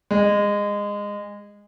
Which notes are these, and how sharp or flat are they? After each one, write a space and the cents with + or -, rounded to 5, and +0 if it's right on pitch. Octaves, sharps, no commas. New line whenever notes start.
G#3 -20